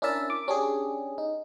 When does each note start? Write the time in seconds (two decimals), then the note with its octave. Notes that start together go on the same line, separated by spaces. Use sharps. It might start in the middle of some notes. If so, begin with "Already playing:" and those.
0.02 C#4 D4 E4 A#4 E5 A5
0.30 D6
0.48 C#4 D4 G4 G#4
1.18 D#4